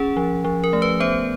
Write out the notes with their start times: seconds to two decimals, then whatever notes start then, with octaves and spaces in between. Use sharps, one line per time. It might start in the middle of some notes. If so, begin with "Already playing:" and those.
Already playing: C#4 G#4
0.17 F3
0.45 F3
0.64 A#4
0.73 A3
0.82 B4
1.00 B3 C5